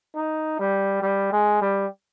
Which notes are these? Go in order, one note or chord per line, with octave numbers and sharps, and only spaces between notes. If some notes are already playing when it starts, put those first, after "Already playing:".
D#4
G3
G3
G#3
G3